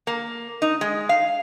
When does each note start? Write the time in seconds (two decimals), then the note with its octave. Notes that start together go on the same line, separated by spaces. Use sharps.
0.07 A#3
0.62 D#4
0.81 G#3
1.09 F5